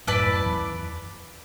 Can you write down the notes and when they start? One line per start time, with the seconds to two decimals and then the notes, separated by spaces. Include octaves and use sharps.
0.07 F#2 A2 E4 B4 D5 A5
0.26 F#2
0.45 E2